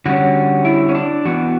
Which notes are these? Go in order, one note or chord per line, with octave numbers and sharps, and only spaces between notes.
D3 G3 C#4 F#4
E4
C#4
D4
E3 B3 F#4